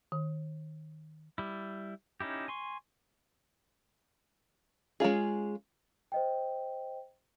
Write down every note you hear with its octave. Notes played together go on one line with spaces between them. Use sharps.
D#3
G3 E4
C#4 D#4 E4 G4
G#5 C6 C#6
G#3 C#4 F4 G#4
C5 D#5 G5